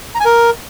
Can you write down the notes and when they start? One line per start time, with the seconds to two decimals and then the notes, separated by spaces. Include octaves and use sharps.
0.15 A#5
0.20 G#5
0.25 A#4